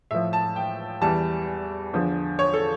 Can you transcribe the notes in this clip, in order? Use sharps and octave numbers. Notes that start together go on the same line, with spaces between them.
A2 F3 E5
A5
G5
E2 E3 G3 A5
E2 D3 F3
C#5
A4